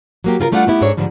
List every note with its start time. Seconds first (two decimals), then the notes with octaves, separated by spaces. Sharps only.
0.24 F#3 A#3 G4
0.40 C#3 F4 G#4 A#4
0.52 G3 A3 D4 F4 A#4 F#5
0.67 A3 B3 E4 G4
0.81 G#2 D4 A4 C#5
0.97 G#2 D3 F3 G3